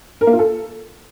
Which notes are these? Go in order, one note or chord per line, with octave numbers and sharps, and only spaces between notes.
A#4
A#3
F4
A4